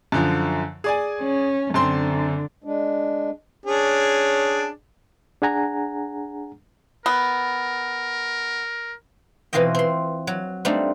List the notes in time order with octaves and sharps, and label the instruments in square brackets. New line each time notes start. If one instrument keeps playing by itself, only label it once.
[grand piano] F#2 D3 F3
G#4 D5 G#5
[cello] C#4
[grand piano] F#2 C4 C6 [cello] D3
[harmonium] G#3 D4
[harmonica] C#4 D4 G#4
[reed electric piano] D4 G#4 F#5 G#5 A#5
[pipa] B3 [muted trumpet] A#4
[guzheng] B2 E3 C4 F4 D#5 G5
C4 C6
F#3
G3 A3 C4 D4 D#4 F4